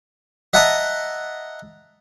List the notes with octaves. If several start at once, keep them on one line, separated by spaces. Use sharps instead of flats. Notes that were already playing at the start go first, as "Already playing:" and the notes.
D#5 E5 F#5 A5 A#5 D#6